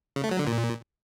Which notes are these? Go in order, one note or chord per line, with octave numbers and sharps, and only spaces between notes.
C#3
A3
F#3
D3
A#2